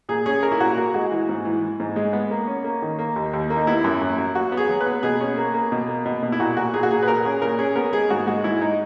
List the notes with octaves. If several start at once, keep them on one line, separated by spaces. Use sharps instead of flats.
A#2 G#4
C#4 G#4
A#3 A#4
E4
A#2 F#4
A#3 F#4
G#3 F#4
E3
G#2
E3
E3
G#2
G#3
B3
A#3
C#4
A#3
D#3
A#3
D#2
D#2
A#3
D#4
B3 E4
F#2
F#2
F#3
F#3 F#4
B3
G#4
F#3
B4
B3
B2 G#4
C#4
A#3
A#3
B2
A#3
B2
B2
E4
A#2 F#4
A#2 F#4
A#2 G#4
F#4
A#2 G#4
B4
A#2 A#4
C#4 G#4
A#2 A#4
C#4 G#4
B3 A#4
G#3 G#4
G#2 F#4
G#3 F#4
G#2 E4
D#4